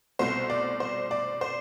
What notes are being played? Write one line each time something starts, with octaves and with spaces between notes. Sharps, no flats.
C2 B2 A3 C5
D5
C5
D5
C5